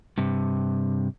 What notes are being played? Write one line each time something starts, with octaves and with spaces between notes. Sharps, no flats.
G2 C3